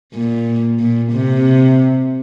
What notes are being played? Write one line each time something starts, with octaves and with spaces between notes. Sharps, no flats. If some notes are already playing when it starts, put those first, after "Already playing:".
A#2
A#2
C3